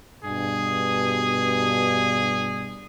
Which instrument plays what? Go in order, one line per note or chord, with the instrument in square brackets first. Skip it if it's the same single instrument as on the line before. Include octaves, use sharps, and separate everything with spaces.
[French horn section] G2 B2 [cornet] G#4